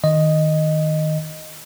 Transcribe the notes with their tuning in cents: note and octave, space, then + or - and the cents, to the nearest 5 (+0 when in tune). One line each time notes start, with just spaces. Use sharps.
D#3 +5 D#5 +0